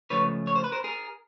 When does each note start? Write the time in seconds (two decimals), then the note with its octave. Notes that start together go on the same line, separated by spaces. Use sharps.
0.10 C#2 C#3 F3 A3 B4 C#5
0.47 C#5
0.56 C5
0.64 B4
0.72 A#4 C5
0.84 G#4 A#4